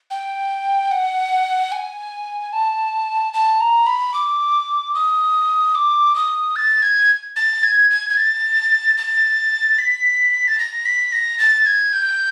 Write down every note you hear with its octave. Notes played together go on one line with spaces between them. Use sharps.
G5
F#5
G#5
A5
A5
A#5
B5
D6
D#6
D6
D#6
A6
G#6
A6
G#6
G#6
G#6
A6
A6
B6
A6
A#6
B6
A#6
A6
G#6
G6